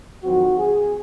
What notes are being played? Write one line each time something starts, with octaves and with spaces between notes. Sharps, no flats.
F2 D#3 F#3 C4 F#4
G#4